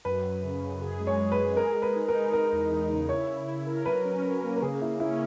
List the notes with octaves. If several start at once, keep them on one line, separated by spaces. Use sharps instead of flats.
F#2 B4
F#2
C#3
F#2
G#4
G#3
C#5
G#4
B4
G#4
G#3 A#4
G#3
B4
D#4
A#4
D#4
G#3 A#4
E2
E2
C#3
E4 C#5
E4
E4
A#4
F#3 B4
C#4
C#4
A#3
A#4
C#3 G#4
C#3 E4
C#4 E4